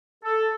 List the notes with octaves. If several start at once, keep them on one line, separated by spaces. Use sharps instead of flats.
A4